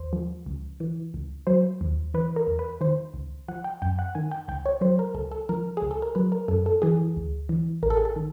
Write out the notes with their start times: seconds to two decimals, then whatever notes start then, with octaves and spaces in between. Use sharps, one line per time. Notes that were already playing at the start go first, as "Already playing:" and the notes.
Already playing: D#2 C5
0.13 F3
0.46 C#2
0.80 E3
1.14 C#2
1.47 F#3 C5
1.81 D#2
2.14 E3 B4
2.36 A#4
2.47 E2
2.59 B4
2.81 D#3 C5
3.14 C#2
3.48 F3 F#5
3.64 G5
3.82 F#2 G5
3.99 F#5
4.15 D#3 G#5
4.31 G5
4.48 C#2 G5
4.66 C#5
4.81 F#3 C5
4.99 A#4
5.15 C#2 A4
5.31 A4
5.49 F3 A#4
5.77 C#2 G#4
5.91 A4
6.02 A#4
6.15 F#3 B4
6.32 A#4
6.48 F#2 A4
6.66 A4
6.82 E3 G#4
7.16 D2
7.49 E3
7.83 A1 A#4
7.90 A4
7.97 G#4
8.05 A4
8.16 D#3